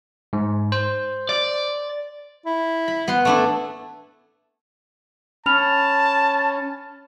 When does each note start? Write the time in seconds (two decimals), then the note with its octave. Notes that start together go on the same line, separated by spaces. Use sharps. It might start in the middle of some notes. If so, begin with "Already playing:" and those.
0.33 G#2
0.72 C5
1.29 D5
2.46 E4
2.88 B5
3.08 B3 F#5 C6
3.25 A3 D4 E4
5.46 C#4 A5 B5 F6 F7